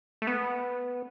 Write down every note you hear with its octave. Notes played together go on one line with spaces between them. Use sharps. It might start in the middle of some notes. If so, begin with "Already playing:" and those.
A3
B3